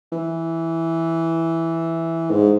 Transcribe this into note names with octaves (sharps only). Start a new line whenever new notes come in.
E3
G#2